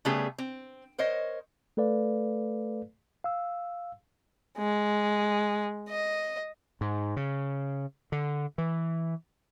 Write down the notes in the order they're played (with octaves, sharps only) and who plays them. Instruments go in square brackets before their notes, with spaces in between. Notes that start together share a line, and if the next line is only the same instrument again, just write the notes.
[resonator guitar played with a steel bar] C#3 G3 A3 B3 G4 G#4
C4
A#4 C5 C#5 D#5
[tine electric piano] A3 A4 B4 D5 F5
F5 E6
[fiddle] G#3
D#5
[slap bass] G#2
C#3
D3
E3